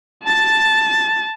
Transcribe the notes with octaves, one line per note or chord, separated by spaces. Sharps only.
A5 A6